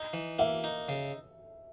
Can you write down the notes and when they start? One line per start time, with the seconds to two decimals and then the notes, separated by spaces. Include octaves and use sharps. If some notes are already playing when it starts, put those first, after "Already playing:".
Already playing: D#4
0.13 E3
0.39 A#3 E5
0.64 D#4
0.89 C#3